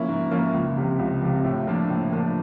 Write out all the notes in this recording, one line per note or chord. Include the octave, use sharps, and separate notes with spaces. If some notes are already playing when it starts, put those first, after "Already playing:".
Already playing: F3 A#3 C#4 E4
G#2
F3 A#3 C#4 E4
C#2
C3 F3
C#2
C3 F3
A2
F3 A#3 D4
A2
F3 A#3 D4